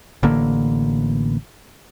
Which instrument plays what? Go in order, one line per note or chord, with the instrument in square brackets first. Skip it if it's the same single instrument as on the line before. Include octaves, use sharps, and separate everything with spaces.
[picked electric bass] A1 D3 A#3